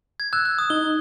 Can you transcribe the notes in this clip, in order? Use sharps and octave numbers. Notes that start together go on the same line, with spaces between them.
G#6
E6 F#6
F#6
D#6
D#4 G7